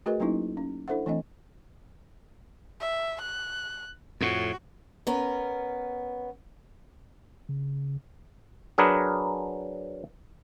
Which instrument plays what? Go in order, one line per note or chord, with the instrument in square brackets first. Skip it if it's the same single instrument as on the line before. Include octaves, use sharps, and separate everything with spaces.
[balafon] A3 F#4 G#4 A#4 B4 D#5
F#3 A#3 C#4 D#4 E4
C#4
D4 E4 A4 C5 E5 F#5
E3 A3 C4 D4 D#5
[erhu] E5
F#6
[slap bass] F2 A2 [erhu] F#4
[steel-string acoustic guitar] B3 C#4 A#4
[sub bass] C#3
[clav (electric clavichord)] F#3 D4 G#4 A#4 B4